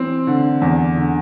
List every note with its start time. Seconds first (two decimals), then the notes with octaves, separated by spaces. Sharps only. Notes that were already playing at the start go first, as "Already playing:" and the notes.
Already playing: E3 C4
0.27 D3
0.61 E2
0.97 D3